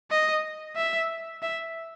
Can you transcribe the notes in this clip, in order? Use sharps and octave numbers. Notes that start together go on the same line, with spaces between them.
D#5
E5
E5